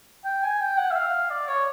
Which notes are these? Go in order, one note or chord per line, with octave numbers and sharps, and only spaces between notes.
G5
G#5
G5
F#5
E5
F5
D5
C#5